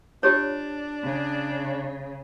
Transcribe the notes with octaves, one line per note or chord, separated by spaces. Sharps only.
D4 F4 G4 C#5
C#3